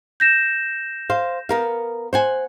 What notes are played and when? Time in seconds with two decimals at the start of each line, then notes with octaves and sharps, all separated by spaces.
0.20 G6 A#6 E7
1.10 C5 F5
1.49 B3 A#4 F5
2.13 C5 F#5 G#5